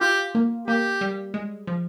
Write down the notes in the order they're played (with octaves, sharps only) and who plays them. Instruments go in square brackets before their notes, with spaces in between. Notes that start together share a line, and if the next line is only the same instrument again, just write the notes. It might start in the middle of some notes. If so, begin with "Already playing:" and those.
[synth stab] F4 [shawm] G4
[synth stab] A#3
[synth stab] A#3 [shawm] G4
[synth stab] G3
G#3
F3